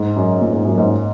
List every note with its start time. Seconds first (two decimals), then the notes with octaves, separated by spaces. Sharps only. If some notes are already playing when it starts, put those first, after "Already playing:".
Already playing: G#2
0.16 F#2
0.41 A#2
0.53 G#2
0.65 F#2
0.78 G#2